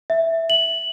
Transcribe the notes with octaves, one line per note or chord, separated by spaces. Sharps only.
E5
F#7